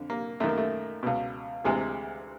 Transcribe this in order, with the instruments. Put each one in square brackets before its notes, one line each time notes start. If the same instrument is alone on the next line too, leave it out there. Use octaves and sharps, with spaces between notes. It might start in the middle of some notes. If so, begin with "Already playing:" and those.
Already playing: [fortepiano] F2 D3
A#3
F#2 A3
D#3
A#3
A3
C#2 B2
D2 C3 E3 G#3